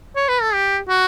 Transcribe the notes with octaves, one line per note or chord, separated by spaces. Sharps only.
C#5
B4
A4
G4
F#4